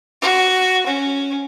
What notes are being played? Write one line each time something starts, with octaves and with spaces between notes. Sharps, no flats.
F#4
C#4